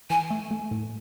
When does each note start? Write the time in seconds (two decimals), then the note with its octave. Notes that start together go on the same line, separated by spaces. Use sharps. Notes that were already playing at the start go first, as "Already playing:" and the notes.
0.10 E3 G#5
0.31 A3
0.51 A3
0.71 A2